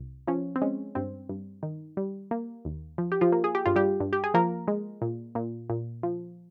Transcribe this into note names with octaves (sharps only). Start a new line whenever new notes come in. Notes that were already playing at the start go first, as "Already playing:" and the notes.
Already playing: C2
F3 C#4
C4
G#3 C#4
G2 C4
G2
D#3
G3
A#3
D#2
F3
G4
F3 F4
A#3
G#4
G4
G2 F4
G3 G4
G2
G4
G#4
F3 A#3 A#4
G#3
A#2
A#2
A#2
F3